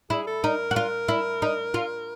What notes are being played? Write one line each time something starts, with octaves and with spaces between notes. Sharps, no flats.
E4 G#4
A4
D#4 A#4
F#4
F4
E4
D#4
F4